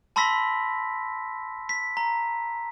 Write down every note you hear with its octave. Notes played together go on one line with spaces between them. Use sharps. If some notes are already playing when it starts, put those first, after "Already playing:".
A5 B5 C6 E6 A#6 B6
B6
A#5